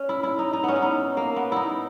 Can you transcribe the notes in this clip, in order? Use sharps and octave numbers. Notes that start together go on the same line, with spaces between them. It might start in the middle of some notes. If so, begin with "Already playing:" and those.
Already playing: C#4
E4
E4
D#4
D#4
B3 C#4
E4
D#4
A#3
B3
D#4 E4